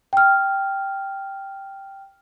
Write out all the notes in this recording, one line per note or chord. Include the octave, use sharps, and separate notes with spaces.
G5 F6